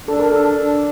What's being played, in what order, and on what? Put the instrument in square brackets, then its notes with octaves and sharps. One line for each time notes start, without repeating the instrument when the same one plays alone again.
[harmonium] D4 [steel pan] A4
[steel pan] A#4
[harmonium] D4 [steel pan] A4
[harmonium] D4